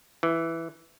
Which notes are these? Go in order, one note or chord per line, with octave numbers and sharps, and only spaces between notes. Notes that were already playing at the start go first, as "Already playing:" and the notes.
E3